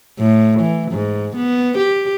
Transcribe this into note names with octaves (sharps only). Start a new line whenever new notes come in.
A2
E3
G#2
B3
G4